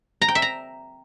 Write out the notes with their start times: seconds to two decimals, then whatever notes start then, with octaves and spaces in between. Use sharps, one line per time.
0.22 A#5
0.28 G5
0.35 E5
0.42 A#5